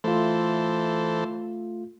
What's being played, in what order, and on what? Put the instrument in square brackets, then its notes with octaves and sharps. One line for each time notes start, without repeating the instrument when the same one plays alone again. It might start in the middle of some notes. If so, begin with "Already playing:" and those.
[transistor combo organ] E3 A4 C5 [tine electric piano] A3 F4